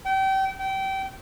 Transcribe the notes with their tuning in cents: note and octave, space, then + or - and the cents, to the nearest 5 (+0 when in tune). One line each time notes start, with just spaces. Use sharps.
G5 -30
G5 -25